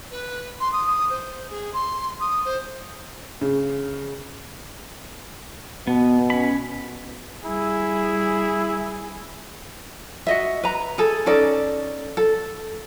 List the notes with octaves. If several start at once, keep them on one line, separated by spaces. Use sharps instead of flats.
B4
C6
D#6
D#6
C5
G#4
C6
D#6
C5
C#3
B2 B3
C#4 B5
G3 E4 G#4
F#4 D#5 E5
B4 A#5
G#4 A4
C#4 D#4 A4 D5
A4